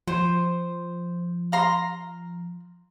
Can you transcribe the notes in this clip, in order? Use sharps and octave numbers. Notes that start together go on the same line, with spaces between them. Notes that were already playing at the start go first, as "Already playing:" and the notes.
F3 C5
F5 A#5 C6